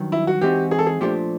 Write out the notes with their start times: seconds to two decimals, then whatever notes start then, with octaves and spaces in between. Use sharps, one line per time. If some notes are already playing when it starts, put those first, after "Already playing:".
Already playing: G2 D#3 F#3
0.12 E4
0.27 F#4
0.41 E3 G#3 C4 D#4 F#4 G4
0.71 G#4
0.79 A4
0.86 G#4
1.01 A#2 F3 A3 D4 G4